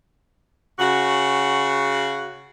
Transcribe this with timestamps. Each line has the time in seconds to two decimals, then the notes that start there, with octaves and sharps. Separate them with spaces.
0.79 C#3 F#4